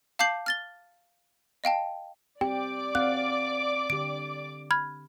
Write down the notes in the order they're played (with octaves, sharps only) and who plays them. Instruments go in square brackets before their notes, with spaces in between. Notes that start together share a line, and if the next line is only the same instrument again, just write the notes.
[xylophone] F5 A5 D6 G6 C7 F#7
F6 A6 G7
D#5 F5 G5 A5
[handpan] C4 G4 [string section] D5 D6 [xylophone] G5
[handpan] C4 F5 F#5 [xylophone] F#6
[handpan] D3 G4 [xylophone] D7
[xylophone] B5 F6 G#6